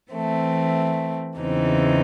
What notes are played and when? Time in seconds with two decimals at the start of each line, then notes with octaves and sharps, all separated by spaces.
0.11 E3 A3 C4
1.39 E2 C#3 E3 C4 D#4